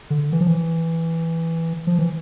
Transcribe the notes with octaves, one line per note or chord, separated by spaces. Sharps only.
D3
E3
F3
E3
F3
E3